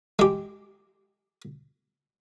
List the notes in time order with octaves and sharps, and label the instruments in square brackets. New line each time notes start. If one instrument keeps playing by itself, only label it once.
[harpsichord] G#3 G4